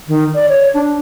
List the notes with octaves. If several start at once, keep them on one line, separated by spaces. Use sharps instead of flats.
D#3
D5
C#5
D4